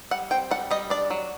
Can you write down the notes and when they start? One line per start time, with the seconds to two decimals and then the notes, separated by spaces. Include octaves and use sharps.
0.11 G3 F#5
0.31 C4 G5
0.51 G3 F#5
0.71 G3 D#5
0.90 D4 D5
1.10 F#3